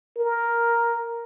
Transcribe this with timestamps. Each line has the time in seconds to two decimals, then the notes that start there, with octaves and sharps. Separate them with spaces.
0.17 A#4